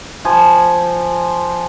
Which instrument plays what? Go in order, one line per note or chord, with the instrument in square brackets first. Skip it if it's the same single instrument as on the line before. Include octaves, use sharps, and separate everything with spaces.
[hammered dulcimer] F3 G#5 B5